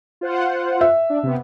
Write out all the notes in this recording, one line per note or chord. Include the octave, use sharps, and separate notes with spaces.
F4 C5 F#5
E5
D4
C3 B3